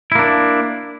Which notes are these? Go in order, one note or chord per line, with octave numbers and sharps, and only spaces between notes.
A#3 D4 E4